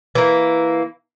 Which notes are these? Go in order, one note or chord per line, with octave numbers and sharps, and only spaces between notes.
E3 A#3